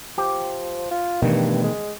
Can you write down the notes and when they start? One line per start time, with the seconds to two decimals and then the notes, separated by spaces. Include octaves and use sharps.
0.18 F3 G4
0.91 F4
1.22 G2 B2 D#3 E3 A3
1.64 G#3